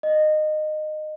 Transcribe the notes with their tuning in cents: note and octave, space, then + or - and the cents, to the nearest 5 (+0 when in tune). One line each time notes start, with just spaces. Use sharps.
D#5 -20